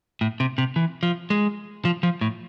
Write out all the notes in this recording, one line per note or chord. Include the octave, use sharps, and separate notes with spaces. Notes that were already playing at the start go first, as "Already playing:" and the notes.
A2
C3
C3
E3
F3
G#3
F3
F3
A2